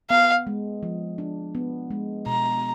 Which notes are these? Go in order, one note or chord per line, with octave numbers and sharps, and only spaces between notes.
B3 F5
G#3
F3
D4
B3
G#3
B2 A#5